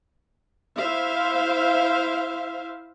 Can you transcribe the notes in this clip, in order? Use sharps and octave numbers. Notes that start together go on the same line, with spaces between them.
E4 C5 E5 F5